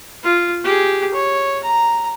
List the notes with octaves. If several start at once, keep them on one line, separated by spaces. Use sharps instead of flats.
F4
G4 G#4
C#5
A#5